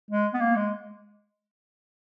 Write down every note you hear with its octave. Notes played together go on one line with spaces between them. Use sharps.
G#3
B3
A#3
G#3